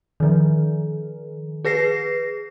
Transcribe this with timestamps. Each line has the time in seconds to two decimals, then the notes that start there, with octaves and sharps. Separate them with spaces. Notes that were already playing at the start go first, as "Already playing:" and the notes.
0.20 D#3 F3
1.65 G#4 B4 A#6 C7